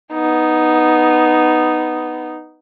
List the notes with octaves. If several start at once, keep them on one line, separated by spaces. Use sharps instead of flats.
B3 D#4